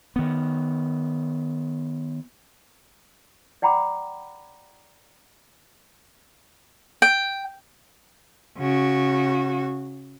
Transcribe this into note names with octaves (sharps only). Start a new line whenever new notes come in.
D#3 B3
D5 F#5 G5 A#5 B5 D6
G5
C#3 F#4